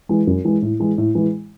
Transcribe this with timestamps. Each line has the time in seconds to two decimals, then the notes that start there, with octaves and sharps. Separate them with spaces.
0.09 E3 G#3
0.27 F#2
0.45 E3 G#3
0.62 A2
0.80 E3 G#3
0.98 A2
1.15 E3 G#3